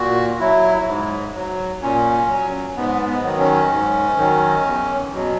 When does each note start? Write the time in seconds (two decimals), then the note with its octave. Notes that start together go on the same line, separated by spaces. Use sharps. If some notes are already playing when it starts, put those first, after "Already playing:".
Already playing: A#2 F#4
0.40 F#3 E4
0.87 G#2
1.34 F#3
1.81 A#2 C#4
2.28 F#3
2.76 G#2 B3
3.07 B3
3.24 D#3 F#3
3.38 C#4
3.70 G#2
4.17 D#3 F#3
4.64 E2
5.12 B2 F#3